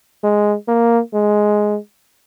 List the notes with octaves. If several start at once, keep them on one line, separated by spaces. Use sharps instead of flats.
G#3
A#3
G#3